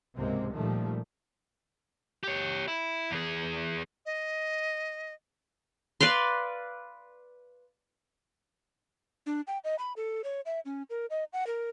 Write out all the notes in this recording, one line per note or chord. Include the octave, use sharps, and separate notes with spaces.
C#2 G#2 C3 G#3 A#3 C4
A#2 D#3 F3 G3 A3
G4 C#5
E4
E2 G#4
D#5
B4 D5 F5 C6
D4
G5
D#5
B5
A4
C#5
E5
C#4
A#4
D#5
F#5
A#4